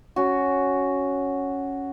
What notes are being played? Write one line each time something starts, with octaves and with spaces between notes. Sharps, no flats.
C#4 F#4